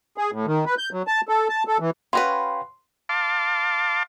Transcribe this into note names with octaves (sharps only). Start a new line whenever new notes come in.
G#4
A2
D#3
B4
G6
F#3
A5
A4
A5
A4
E3
C#4 F#4 B4 F5 G5 B5 C6
F5 A5 C6 D6